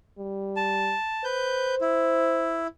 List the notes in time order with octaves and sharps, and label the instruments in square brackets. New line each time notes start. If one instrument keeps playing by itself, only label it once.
[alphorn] G3
[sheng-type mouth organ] A5
[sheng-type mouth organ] B4 G6 [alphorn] C5
[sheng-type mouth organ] E4